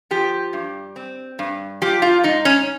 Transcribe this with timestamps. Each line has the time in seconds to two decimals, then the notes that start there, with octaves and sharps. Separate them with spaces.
0.11 F3 G4
0.53 G2
0.96 C4
1.39 G2
1.82 F3 G4
2.02 F4
2.23 G#2 D#4
2.45 C#4